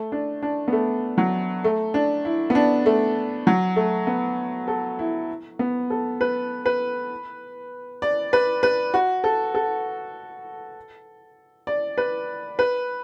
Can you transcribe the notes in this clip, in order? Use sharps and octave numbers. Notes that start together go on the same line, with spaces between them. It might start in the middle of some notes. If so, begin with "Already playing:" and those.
Already playing: A3
D4
D4
B3
A3
F#3
A3
D4
E4
B3
D4
A3
F#3
A3
B3
A4
E4
B3
A4
B4
B4
D5
B4
B4
F#4
A4
A4
D5
B4
B4